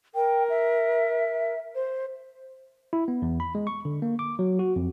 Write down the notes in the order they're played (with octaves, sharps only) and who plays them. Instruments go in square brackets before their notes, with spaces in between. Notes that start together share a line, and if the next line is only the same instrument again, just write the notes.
[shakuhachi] A#4 [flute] G5
[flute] E5
C5
[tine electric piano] E4
B3
E2
B5
G#3
C#6
D3
A#3
D6
F#3
F#4
F2